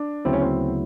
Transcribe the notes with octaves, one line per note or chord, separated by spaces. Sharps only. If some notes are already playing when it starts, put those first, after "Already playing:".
Already playing: D4
D2 C#3 F#3 B3 C4 E4
C#4
C4